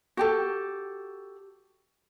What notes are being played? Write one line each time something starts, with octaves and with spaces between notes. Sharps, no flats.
F#4 G4 A4